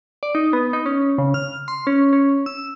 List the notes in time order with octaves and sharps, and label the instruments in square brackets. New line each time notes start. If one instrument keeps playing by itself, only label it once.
[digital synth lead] D5
D#4
B3
D#4
C#4
C#3
F6
C6
C#4
C#4
E6